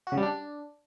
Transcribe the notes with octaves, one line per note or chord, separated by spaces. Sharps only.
F#4
C#3
G3
D4